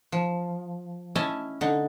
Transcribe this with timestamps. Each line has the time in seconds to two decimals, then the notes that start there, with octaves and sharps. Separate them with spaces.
0.12 F3
1.15 C#4 E4 D#5 G#5 A5
1.61 D3 D#4